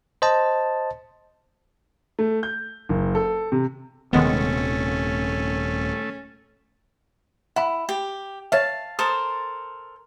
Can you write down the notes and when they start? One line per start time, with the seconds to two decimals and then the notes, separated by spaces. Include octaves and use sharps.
0.22 C5 D#5 A5
2.19 A3
2.43 G6
2.89 F#1
3.15 A4
3.52 C3
4.13 D#1 C3 D#3 G#3 A3 B3 C#4
7.56 E4 F#5 B5
7.89 G4
8.52 C#5 E5 F5 A5
8.99 A4 A#4 C5 D#6